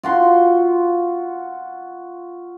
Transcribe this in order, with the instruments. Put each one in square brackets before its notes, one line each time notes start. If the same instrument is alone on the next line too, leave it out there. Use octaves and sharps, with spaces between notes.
[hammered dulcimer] F4 F#4 C6